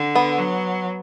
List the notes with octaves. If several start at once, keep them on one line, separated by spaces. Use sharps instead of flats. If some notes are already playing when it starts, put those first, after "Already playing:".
Already playing: D3
B3
F#3